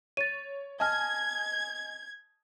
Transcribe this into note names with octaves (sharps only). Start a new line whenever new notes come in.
C#5 A6 D#7
D#5 G#5 A5 F6 G#6